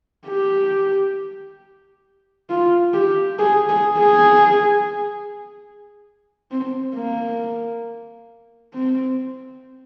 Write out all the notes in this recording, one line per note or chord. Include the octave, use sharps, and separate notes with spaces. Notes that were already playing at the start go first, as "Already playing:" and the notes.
G4
F4
G4
G#4
G#4
G#4
C4
A#3
C4